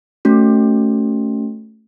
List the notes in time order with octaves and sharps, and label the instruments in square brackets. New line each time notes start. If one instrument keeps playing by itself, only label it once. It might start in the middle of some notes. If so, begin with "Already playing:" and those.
[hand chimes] A3 C#4 F#4